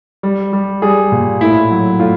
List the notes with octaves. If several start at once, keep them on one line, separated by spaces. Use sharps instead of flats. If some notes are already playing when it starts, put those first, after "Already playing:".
G3
G3
G3 G#4
A#2
A2 E4
F#3
A2 F4